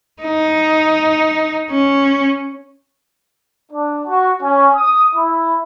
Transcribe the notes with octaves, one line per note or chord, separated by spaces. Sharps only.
D#4
C#4
D4
F#4
C#4
D#6
E4